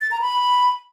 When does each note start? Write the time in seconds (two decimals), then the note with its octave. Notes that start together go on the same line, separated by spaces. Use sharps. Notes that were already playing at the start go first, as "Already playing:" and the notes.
0.01 A6
0.11 A#5
0.21 B5